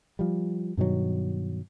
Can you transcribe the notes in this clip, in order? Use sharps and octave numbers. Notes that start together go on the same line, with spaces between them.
F3 G3
G2 B2 D#3 F#3